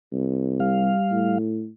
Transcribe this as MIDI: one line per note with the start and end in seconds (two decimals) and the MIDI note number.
0.12 0.93 36
0.60 1.38 55
0.60 1.38 77
1.11 1.69 45